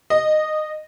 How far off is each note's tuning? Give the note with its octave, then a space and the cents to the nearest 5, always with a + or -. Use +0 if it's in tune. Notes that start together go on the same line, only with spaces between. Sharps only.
D#5 -15